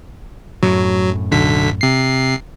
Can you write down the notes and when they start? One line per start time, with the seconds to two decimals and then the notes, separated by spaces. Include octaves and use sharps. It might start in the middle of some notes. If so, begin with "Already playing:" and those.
0.63 F#2 A2 F#3
1.32 B1 D3 B6
1.81 C3 C7